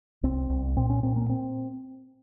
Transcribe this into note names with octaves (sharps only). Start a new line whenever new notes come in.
C2 C4
C2
A#2 C4
C#4
A#2 C4
A#3
C4